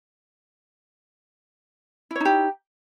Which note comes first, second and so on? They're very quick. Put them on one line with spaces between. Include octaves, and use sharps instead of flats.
E4 C#5 D#4 G4